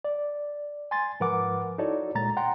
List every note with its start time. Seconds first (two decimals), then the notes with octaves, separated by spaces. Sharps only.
0.05 D5
0.91 G#5 C6 A6
1.20 G#2 F3 A#4 B4 F#5 D6
1.78 D#4 E4 F#4 A4 C#5 D5
2.14 C2 A#2 G#3 A#5 A6
2.37 F#5 G5 A#5 C6